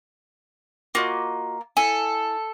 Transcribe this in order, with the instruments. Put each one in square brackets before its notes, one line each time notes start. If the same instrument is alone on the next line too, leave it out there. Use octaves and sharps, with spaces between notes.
[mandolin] A#3 [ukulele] F4 F#4 D#5
[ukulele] E4 G#5 [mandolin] A4